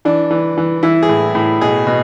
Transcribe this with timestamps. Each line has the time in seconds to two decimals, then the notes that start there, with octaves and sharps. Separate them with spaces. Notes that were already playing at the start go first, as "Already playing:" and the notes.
0.05 E3 D4
0.31 E3
0.57 E3
0.83 E3 E4
1.03 G#4
1.09 A2
1.35 A2
1.61 B2 G#4
1.87 B2